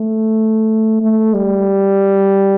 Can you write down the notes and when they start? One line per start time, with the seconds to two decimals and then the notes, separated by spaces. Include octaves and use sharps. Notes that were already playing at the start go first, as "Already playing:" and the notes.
Already playing: A3
1.02 A3
1.34 G3